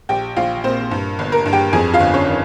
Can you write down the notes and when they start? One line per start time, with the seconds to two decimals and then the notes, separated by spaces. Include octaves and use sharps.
0.09 A#1 G4 G5
0.36 A#1 F4 F5
0.64 A#2 C4 C5
0.91 G2
1.19 G1
1.32 A#4
1.46 G2
1.53 G4 G5
1.73 F2 G#4 G#5
1.94 F4 F5
2.00 G1
2.14 C#4 C#5
2.27 D#3